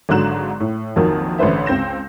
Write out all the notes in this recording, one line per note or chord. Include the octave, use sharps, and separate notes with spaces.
G#1 G#2 D3 F#3 F#6 E7
A2
A#1 F2 D#3 F#3 A#3
A1 D3 B4 C5 E5
C#2 C4 G6 A#6 E7